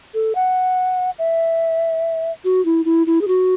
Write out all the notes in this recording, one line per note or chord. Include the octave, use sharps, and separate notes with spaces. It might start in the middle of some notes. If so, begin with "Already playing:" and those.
A4
F#5
E5
F#4
E4
E4
E4
G#4
F#4